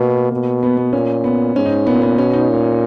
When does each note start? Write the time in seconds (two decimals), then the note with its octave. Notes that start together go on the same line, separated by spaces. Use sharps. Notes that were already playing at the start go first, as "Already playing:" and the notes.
Already playing: B2 A#3 B3
0.32 B2
0.63 B3
0.77 B3
0.93 A#2 C#4
1.24 B3
1.55 G#2 C#4
1.66 D#4
1.87 A#2 B3
2.02 B3
2.18 B2 C#4
2.34 D#4
2.49 A#2